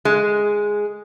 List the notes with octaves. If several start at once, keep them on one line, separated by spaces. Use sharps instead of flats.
G#3